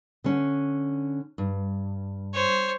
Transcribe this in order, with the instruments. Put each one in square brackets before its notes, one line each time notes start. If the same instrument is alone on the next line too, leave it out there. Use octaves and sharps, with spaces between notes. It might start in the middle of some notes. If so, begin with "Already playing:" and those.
[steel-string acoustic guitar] D3 C#4
G2
[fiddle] C5 C#5